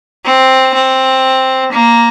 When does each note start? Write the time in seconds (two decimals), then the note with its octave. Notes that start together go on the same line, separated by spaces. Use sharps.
0.25 C4
0.74 C4
1.72 A#3